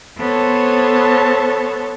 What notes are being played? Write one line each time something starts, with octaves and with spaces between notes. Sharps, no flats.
B3 A4 C5 C#5 A5